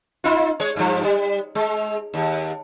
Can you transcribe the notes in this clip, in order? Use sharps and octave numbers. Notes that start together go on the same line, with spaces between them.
D#4 F4
G#3 C#5
G2 F3
G3
G#3
D#2